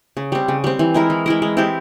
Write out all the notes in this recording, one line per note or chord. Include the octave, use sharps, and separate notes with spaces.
C#3
G3 C4
C#3
G3 C4
E3
G#3 E4 A#4
E3
G#3 E4 A#4
G#3
C4 E4 G4